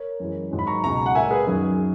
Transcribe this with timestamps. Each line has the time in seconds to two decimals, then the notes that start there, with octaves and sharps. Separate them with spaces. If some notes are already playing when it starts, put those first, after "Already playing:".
Already playing: A#4 C#5
0.20 F#2 E3 G#3
0.52 G#2 D#3 F#3
0.59 B5
0.67 A#5 C#6
0.84 C#2 B2 G#3 A#5 C#6
1.06 F#5
1.15 A#2 G#3 E5 G#5
1.30 G#4 B4
1.47 F#2 D#3 F#3 G#4